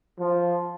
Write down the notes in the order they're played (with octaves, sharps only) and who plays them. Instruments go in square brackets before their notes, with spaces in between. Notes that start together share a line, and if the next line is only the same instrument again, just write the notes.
[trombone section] F3